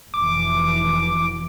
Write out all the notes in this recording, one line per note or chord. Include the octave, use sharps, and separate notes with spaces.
F1 B2 E3 D6